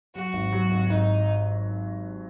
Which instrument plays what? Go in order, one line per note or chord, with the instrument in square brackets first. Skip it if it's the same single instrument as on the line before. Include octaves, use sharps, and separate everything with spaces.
[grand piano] F#3 [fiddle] F#4
[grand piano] G#1
F#3
G#1
[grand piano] G#1 [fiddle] D#4